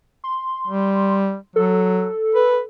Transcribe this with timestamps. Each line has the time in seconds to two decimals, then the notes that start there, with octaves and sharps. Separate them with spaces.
0.24 C6
0.68 G3
1.56 F#3 A4
2.35 B4